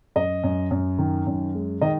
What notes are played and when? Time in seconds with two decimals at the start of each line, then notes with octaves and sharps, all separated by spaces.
0.16 F#2 D#5
0.44 F#2
0.71 F#2
0.98 D#3
1.27 F#2
1.55 G#3
1.81 D#3 D#5